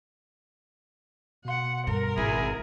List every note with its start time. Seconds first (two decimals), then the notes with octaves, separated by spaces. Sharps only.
1.45 B2 F#5 C6
1.87 G2 A#4
2.18 G#1 E4 G#4